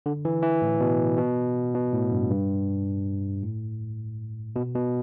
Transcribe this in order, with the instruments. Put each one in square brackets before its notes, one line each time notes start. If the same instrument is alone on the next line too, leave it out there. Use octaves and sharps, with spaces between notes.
[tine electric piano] D3
E3
E3
A2
B2
B2
B2
A2
G2
G2
A2
B2
B2